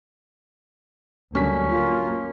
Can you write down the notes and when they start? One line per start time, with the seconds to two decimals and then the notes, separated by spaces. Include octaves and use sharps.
1.35 D2 G2 D3 F#3 A#3 C#4 B6
1.69 A#3 F4